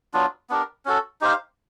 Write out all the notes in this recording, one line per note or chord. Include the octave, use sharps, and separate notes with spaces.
F#3 B3 D4 F4
B3 D4 G4 A#4
C#4 F#4 A4
D#4 G4 C5 F5